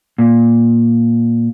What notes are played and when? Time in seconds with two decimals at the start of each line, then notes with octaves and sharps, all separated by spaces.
0.18 A#2